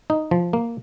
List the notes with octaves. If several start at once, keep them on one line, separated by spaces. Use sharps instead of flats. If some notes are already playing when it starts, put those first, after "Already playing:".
D#4
F3
A#3